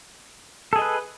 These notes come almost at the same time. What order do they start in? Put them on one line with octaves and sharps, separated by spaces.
A4 G#4 D#5 B4